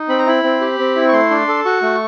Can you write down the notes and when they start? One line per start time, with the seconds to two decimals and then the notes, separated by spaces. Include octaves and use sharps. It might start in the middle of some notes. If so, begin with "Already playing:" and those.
Already playing: D#4
0.08 C4 B5
0.19 A#5
0.26 E4 B5
0.43 C4
0.61 G4
0.79 C4
0.96 E4
1.08 C#6
1.13 A3 C6
1.30 D4
1.48 A4
1.65 F#4 C#6
1.82 A3